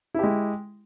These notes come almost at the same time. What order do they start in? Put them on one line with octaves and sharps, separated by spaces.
E4 G4 G#3